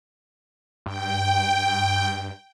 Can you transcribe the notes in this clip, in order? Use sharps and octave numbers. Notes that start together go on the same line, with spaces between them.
G2 G5